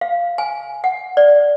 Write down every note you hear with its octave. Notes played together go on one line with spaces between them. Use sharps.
F5
G#5
F#5
D5